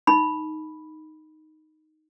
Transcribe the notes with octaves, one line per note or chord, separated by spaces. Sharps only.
D#4 B5